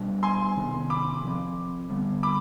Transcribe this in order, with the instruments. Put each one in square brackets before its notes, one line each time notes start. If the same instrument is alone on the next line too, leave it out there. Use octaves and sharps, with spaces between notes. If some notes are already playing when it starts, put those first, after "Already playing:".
Already playing: [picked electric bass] B2 G3 D4
[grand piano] G#5 C6
[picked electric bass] C3 D#3 B3
[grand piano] B5 D6
[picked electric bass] F3 C4
D3 G3 B3
[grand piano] B5 D6